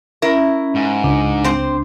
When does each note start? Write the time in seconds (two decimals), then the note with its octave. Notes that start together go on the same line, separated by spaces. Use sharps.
0.22 C#4 E4 A#4
0.75 G#2
1.04 C#2 D4
1.44 C4 C5